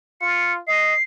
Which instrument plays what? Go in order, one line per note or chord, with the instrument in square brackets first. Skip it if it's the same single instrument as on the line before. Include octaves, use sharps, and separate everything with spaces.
[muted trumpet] F4 [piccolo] C#7
[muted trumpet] D#5 [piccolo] C7